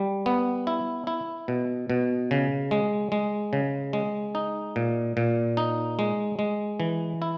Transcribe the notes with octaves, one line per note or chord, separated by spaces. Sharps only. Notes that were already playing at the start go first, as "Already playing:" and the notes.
Already playing: G3
B3
E4
E4
B2
B2
C#3
G#3
G#3
C#3
G#3
D#4
A#2
A#2
D#4
G#3
G#3
E3
E4